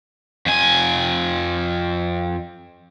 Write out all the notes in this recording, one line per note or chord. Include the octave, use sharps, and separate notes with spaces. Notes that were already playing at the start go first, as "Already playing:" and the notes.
F2 G#5